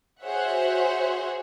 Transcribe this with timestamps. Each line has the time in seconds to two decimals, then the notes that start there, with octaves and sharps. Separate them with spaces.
0.23 F#4 G#4 C5 C#5 E5 F#5